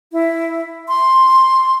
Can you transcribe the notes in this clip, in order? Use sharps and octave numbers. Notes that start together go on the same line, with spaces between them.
E4
C6